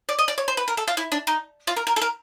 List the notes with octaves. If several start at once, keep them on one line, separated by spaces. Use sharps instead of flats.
D5
D#5
D5
C#5
C5
B4
A#4
A4
F4
E4
D4
D#4
F4
A#4
A#4
A4
A#4